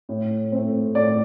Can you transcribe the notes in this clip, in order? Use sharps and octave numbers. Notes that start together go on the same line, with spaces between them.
A2
A3 C4
A2 D5